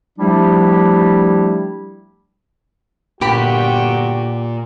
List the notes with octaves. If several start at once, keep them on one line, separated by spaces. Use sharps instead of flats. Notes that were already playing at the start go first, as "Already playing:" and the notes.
F3 G3 A3 D4 E4 G4
G1 A#2 F#4 G4 G5 B5